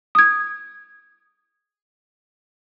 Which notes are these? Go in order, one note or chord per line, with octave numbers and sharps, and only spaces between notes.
D#6 G#6